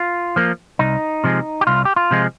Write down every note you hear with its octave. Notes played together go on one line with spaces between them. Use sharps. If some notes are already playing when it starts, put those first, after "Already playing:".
Already playing: F4
F3 A#3
C2 D#4
C3 F3 G#3
G4
C2 F4
G4
F4
C3 F3 G#3